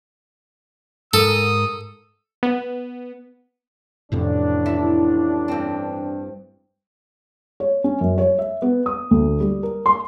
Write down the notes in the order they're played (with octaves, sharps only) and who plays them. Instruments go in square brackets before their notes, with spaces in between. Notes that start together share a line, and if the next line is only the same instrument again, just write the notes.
[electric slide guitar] G#2 A#4 [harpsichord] A4 [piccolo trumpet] D#6
[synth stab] B3
[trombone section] A1 D4 [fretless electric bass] F2 A2 C3
[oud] E4
G2 C4
[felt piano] C#5
C#4
F#2
C#5
E5
B3
D#6
D2
G3
A#4
C6